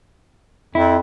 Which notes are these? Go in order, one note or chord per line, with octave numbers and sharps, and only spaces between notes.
F2 E4